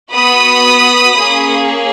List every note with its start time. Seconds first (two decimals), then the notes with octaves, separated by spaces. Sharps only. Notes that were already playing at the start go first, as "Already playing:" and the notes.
0.13 B3 F#4 B5 D#6
1.19 A#3 C#4 G#4